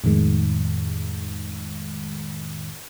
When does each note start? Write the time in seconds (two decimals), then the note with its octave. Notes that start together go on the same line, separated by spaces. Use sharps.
0.04 F2 A2 D#3 G#3